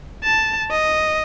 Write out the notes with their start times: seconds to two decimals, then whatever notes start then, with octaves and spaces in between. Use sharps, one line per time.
0.24 A5
0.71 D#5